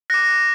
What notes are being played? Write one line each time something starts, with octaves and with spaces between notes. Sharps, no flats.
D6 F#6 A#6